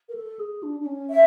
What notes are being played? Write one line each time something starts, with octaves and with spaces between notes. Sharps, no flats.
A#4
A4
G#4
D4
D4
C#4
E5